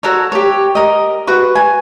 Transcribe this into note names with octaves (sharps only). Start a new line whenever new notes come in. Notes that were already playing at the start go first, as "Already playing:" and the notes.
F#4 A4 A#4 C#5
G4 C#5
A#4 D#5
F#4 B4 C#6
G#5